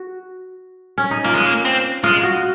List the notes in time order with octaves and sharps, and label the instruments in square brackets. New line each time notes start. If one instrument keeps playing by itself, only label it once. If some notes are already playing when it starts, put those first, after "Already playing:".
Already playing: [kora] F#4
C#4
D#4
[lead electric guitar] A#3 [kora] F4
[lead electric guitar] G#3
A#3
C4
[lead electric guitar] G#3 [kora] F4
[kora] F#4